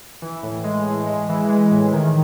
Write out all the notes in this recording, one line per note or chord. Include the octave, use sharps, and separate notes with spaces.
E3
A2
G#3
A2
G#3
E3
G#3
A2
D#3